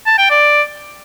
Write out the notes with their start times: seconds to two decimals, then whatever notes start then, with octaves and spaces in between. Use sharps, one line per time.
0.06 A5
0.18 G5
0.30 D5